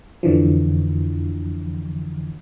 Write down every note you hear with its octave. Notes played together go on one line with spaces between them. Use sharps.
F2 D3 E3 F3